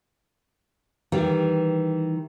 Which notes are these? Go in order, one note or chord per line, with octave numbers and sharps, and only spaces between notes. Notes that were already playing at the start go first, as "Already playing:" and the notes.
D#3 E3 G3